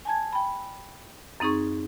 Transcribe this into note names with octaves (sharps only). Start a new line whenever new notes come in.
G#5 A5 G#6
G5 B5
F#2 C4 D#4 G#4 C#6